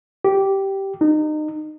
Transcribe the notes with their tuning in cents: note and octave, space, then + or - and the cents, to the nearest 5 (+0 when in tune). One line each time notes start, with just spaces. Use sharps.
G4 -10
D#4 -30